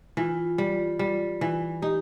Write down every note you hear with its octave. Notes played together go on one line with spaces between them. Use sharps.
E3 F4
G3
G3
E3
D#4 G4